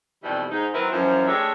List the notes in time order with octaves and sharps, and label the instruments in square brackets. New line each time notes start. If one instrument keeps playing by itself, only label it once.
[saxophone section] F2 B2 D#3 E3 G3
G#2 D#4
D#3 F#3 C4 E4 A#4 B4
F#2 E3 F3
G#3 A3 D4 G4 C#5 E5